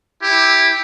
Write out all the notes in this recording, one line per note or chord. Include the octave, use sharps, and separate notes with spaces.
E4 G4